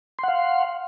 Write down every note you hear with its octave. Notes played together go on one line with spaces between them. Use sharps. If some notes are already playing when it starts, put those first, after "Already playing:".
F5 F#5 C6